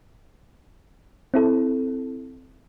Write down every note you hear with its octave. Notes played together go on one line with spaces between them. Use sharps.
C4 E4 A4